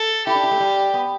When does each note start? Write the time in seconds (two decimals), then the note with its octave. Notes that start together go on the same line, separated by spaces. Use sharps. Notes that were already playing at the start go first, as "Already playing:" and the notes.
Already playing: A4
0.27 E4 G4
0.35 D4
0.43 E4
0.51 A3
0.60 G3
0.94 B3